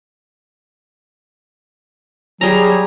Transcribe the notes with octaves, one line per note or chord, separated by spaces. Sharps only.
F#3 G3 G#4 A#5